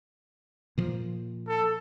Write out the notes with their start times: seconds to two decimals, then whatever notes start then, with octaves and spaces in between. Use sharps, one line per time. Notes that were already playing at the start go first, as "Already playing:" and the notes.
0.78 A#2 F3
1.48 A4